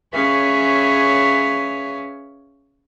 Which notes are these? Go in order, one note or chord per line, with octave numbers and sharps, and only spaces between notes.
C#4 G#4 B4 C#5 E5 F5